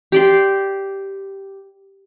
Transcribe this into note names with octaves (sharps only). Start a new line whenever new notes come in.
G4 D5 C6